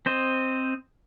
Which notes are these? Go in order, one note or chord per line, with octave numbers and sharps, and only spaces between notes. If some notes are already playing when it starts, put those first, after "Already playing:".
C4 C5 D#5